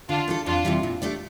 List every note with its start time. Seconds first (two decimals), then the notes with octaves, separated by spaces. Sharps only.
0.09 D3 D4 F4
0.28 A3 D4 F4 A4
0.46 F2 D4 F4
0.65 C3 E3 G3
0.83 A#2
1.02 A3 D4 G4 D5